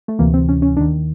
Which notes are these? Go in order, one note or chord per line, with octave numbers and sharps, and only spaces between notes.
A3
D2 C3 E3 A#3
C4
C#4
C#4
D#2 D#3 D4